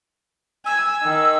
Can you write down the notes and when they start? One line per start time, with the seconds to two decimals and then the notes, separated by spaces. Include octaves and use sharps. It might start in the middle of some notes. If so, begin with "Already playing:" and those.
0.66 G#5 E6
1.03 D#3